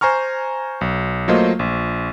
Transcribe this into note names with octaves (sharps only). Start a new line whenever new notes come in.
C5 G#5 A#5 C#6 F6
B1
F#3 A3 A#3 F4 C5 D#5
A#1